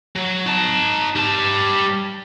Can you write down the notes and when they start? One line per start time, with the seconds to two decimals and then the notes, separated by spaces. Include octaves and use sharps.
0.16 F#3
0.46 D#4 A5
1.16 G3 A5